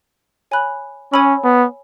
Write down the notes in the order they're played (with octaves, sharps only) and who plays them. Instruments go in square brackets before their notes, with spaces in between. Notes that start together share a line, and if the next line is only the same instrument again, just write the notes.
[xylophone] C#5 G#5 B5 F#6
[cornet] C#4 [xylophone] C#5 G#5 B5 E6
[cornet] B3